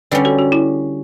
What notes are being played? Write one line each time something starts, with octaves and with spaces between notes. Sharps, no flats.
D3 G3 C#4 B4 D5
F#4 A4
F#4
E4